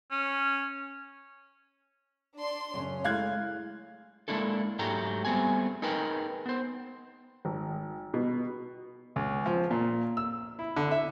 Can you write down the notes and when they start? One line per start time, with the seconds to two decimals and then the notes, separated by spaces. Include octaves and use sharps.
0.12 C#4
2.36 D4 D5 C6
2.74 F#2 C#3 C#4 C#5
3.04 G#3 A3 E4 F5 F#6 G#6
4.28 G#3 A#3 D4 E4 A4
4.79 G#2 F#3 G#3 A3 G4 A#5
5.25 G3 A3 B3 C4 G#4 G#5
5.82 D#4 G#4 A#4 B4 G5
6.46 B3 C5
7.45 G#1
8.14 B2
9.16 C#2
9.46 F3
9.71 A#2
10.17 E6
10.59 E4
10.76 D3
10.91 E5